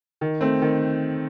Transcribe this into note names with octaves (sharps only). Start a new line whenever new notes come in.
D#3
A3 C4
D#3